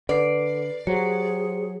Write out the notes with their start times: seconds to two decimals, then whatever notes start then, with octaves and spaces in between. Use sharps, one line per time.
0.09 D3 B4 D5 C7
0.87 F#3 G4 G#4 C5 C#7